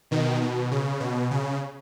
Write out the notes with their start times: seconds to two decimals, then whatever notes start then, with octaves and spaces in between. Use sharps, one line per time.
0.11 B2 D#3
0.42 B2
0.71 C#3
1.00 B2
1.31 C#3